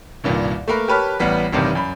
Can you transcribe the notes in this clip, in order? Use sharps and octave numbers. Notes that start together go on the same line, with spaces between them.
C2 G2 A#2 D#3
A3 A#3 A#4 B4
G4 A#4 B4 C#5 A5 F6
A1 G3 B3 B6
A1 G2 C3 D#3
F#2 B5